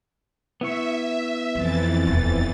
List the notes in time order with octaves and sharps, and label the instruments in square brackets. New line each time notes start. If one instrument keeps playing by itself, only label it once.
[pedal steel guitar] B3 E4 C#6 [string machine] E5
[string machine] F2 E3 A6 [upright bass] F3
[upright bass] D#1